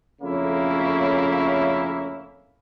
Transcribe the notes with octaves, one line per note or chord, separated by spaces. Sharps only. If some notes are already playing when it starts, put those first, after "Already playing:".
F2 C#3 A3 A#3 C#4 E4